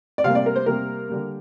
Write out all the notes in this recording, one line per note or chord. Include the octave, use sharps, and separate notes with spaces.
D5
C3 G3 A#3 F5
D5
A#4
C5
C3 G3 A#3 A#4
D3 G3 A#3